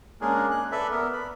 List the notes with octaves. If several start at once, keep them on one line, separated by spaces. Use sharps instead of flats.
G#3 A#3 C#4 D4 G#4 A#4
F#6
A4 B4 D5 E5
B3 A#4
B5